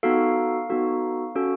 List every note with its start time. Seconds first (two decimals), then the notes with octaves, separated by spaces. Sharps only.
0.03 B3 D#4 F#4 A4 F5
0.69 B3 D#4 F#4 A4
1.35 C#4 F#4 A4